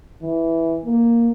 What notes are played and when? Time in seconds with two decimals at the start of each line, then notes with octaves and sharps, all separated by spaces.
0.23 E3
0.85 A#3